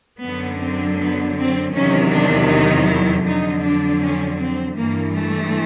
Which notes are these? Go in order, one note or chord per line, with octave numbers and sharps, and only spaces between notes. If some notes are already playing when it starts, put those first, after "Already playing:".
F#2 D3 F#3 B3
C4
B3
C4
E2 C3 D#3 F#3 C#4
D4
D#4
E4
F2 D3 F#3 D#4
D4
C#4
C4
G2 E3 A#3
A3